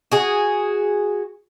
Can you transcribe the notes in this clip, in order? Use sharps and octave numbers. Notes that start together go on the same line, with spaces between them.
F#4 G#4